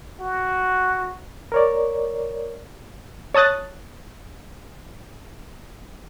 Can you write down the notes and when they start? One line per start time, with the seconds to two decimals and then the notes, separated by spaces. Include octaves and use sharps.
0.20 F#4
1.52 A#4 C#5 D5
3.34 C#5 A5 D#6 F#6 A6